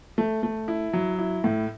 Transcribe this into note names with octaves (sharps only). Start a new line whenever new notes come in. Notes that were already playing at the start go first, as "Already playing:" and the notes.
A3
A3
E4
F#3
E4
A2